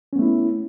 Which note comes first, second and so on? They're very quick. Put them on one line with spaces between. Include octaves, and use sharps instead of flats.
C#4 B3 A3 E4